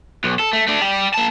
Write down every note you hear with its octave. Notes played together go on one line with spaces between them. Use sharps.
B1
A4
A3
A3 D4
G3 G4
A#3 A5